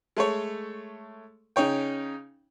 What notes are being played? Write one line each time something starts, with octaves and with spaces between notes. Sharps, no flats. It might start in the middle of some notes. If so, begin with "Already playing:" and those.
G#3 A3 A4 C#5
C#3 C#4 D#4 C#5 G5